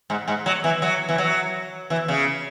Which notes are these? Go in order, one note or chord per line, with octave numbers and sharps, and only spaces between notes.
G#2
G#2
F#3
E3
F#3
E3
F#3
E3
C#3